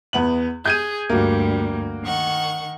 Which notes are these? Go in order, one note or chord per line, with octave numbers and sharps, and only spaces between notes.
E2 B3 F#7
G#4 G6 G#6 D#7
D2 G2 G3 A#3 F#4
D#3 F#5 C#6